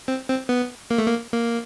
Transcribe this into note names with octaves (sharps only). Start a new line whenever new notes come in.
C4
C4
B3
A#3
A3
A#3
A#3